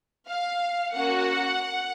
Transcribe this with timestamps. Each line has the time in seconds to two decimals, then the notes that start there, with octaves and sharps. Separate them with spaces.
0.28 F5
0.94 A#3 C#4 F#4 F#5